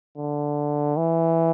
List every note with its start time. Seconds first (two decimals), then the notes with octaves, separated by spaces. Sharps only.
0.18 D3
0.97 E3